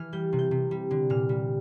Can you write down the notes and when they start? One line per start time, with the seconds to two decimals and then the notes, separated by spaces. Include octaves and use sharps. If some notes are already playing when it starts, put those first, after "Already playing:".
Already playing: E3 F6
0.13 G3 G6
0.33 C3
0.39 G6
0.51 C3
0.71 G3
0.91 D3
1.10 A#2 F6
1.29 G3